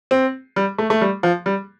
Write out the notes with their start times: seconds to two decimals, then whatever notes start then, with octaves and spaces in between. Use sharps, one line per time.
0.11 C4
0.56 G3
0.78 A3
0.90 A3
1.01 G3
1.23 F3
1.46 G3